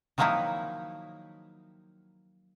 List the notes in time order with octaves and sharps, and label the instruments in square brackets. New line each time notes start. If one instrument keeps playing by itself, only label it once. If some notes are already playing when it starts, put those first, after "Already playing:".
[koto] D#3 F3 F#3 A#3 D#4 E4